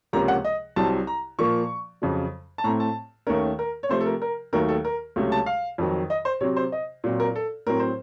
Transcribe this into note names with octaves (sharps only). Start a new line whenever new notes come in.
C#2 C3 F3 A#3 C#4 A#5
F#5
D#5
C2 C3 F#3 C4 A5
A#5
A#2 F3 A#3 C#6
F2 C#3 F#3
A5
A2 A3 C4 A#5
A5
D#2 D#3 A3 C#4 A#4
A#4
C#5
C3 F3 A3 C4 C5
A4
A#4
A#4
D#2 D#3 F#3 A3 A#4
A4
A#4
C#2 C3 F#3 A3 C#4
A5
F5
F2 D#3 F#3
D#5
C5
C3 F#3 C4 C#5
C5
D#5
A#2 F#3 C4
A#4
A4
A2 F#3 C4 A#4
C5